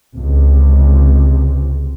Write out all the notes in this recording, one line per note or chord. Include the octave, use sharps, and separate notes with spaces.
C#2 C3